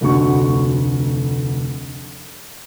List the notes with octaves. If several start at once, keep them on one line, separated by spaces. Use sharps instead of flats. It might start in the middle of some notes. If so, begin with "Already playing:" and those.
F1 D2 D3 F#4 C#6